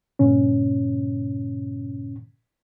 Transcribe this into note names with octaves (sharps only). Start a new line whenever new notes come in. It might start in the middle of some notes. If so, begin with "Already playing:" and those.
G2 A#2 C#3 C#4